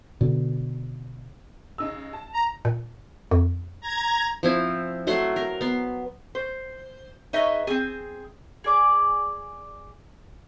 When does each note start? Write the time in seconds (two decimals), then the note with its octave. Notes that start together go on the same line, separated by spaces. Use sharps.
0.21 B2 D3
1.78 C#3 D#4 E6
2.13 A5
2.34 A#5
2.65 A#2
3.31 F2
3.81 A#5 G#6
4.43 F3 C4 E4
5.07 F#3 A3 F#5 C6
5.36 A#4
5.61 B3 C6
6.35 C5
7.33 D#4 G#4 B4 C#5 D#5 E5
7.67 C4 G#4
8.64 G#4 D5 D6